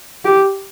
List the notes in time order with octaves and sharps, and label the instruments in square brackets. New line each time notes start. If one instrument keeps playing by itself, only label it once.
[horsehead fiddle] G4